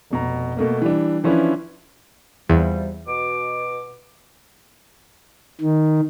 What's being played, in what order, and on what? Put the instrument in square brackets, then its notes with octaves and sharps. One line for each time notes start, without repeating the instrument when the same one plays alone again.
[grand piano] F1 B2 A#5
B2 A3 A#3
E3 G3 D4
E3 F3 C#4 D4 E4 B4
[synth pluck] E2 [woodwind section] C3 F3 G3
[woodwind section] B2 D6
[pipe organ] D#3